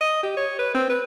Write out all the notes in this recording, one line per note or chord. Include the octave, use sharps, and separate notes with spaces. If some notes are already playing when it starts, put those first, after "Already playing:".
D#5
G4
C#5
B4
C4
B4